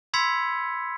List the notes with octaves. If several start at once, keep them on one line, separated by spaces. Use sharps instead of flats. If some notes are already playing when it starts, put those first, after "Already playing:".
B5 C6 E6 G#6 B6 C#7